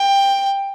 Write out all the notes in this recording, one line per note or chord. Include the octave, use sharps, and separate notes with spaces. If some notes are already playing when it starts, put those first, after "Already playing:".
Already playing: G5